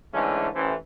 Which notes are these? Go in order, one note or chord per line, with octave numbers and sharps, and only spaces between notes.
G#2 D3 E3 G#3 A3 C#4
A1 E3 C#4 E4 A4 C5